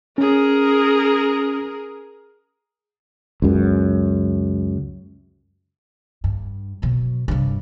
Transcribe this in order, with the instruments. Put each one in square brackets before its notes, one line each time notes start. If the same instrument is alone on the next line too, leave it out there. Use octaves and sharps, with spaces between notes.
[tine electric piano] C#4 [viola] G#4 A#4
[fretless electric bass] C#2 F#2
[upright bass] G2
B2 F#3
G2 C3